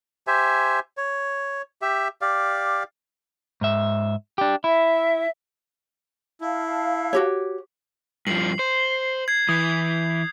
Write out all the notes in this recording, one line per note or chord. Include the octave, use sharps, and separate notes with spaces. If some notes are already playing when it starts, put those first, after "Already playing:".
G4 C5 E5 G#5
C#5
G4 E5
G4 D5 F5
G#2 E5
D4 G4
E4 E5
E4 F5 A5
F#4 G4 C#5
G2 F3 C7 F#7
C5
G#6 C7
E3 D#6 G6